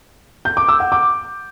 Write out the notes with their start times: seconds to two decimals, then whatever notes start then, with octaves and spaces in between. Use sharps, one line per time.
0.45 G6
0.57 D6
0.68 E6
0.80 F#5
0.92 D6